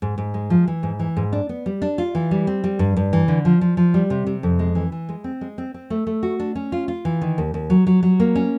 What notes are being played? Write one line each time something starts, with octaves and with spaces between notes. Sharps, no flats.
G#2
G#2
G#3
F3
E3
G#2
E3
G#2
D4
B3
G3
D4
F4
E3
G3
C4
G3
G2
G2
E3
D3
F3
F3
F3
G3
C3
C3
F2
G#3
E3
E3
G#3
C4
G#3
C4
C4
A3
A3
F#4
D4
C#4
F4
F4
E3
D#3
D#2
D#2
F#3
F#3
F#3
A#3
C#4